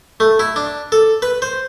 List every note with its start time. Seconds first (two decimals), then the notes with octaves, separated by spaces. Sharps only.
0.20 A3
0.40 E4
0.56 D4
0.92 A4
1.22 B4
1.42 C5